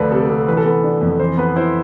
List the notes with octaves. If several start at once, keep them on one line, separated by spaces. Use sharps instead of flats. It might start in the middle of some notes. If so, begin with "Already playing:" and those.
Already playing: D2 F3 A3 B4 D5
C3 A4
C3 A4
E3 B4
A4
B3 B4
D4
F2
E3 C5
B3 B4
E4 C5